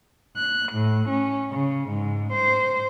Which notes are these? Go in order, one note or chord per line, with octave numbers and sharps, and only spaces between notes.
F#6
A2
C#4
C#3
G#2
C5